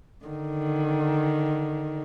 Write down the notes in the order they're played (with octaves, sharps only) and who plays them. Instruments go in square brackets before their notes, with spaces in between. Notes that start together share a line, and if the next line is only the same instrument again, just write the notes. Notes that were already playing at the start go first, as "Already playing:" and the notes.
[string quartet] D3 D#3